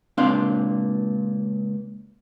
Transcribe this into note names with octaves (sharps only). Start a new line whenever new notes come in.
C#2 A#2 C4 D4 F5 C6